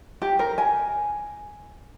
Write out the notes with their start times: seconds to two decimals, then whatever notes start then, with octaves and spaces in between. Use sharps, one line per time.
0.22 G4
0.39 A#4
0.58 G#5